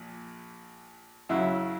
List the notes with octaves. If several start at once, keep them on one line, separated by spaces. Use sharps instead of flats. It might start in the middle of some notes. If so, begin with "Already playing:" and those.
Already playing: A#1 A#2
F#2 C#3 F#3 E4